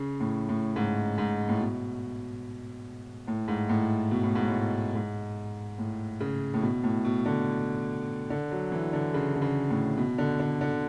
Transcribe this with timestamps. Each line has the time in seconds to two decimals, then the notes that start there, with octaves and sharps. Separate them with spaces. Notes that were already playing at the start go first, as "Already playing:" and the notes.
Already playing: C#3
0.20 A2
0.49 A2
0.76 G#2
1.18 G#2
1.49 A2
1.60 B2
3.28 A2
3.48 G#2
3.69 A2
4.11 B2
4.23 A2
4.35 G#2
4.48 A2
4.95 G#2
5.78 A2
6.20 C#3
6.54 A2
6.62 B2
6.84 A2
7.05 B2
7.26 D3
8.30 D3
8.51 F#3
8.72 E3
8.93 D3
9.14 C#3
9.35 D3
9.42 C#3
9.70 A2
9.97 B2
10.18 D3
10.39 D3
10.61 D3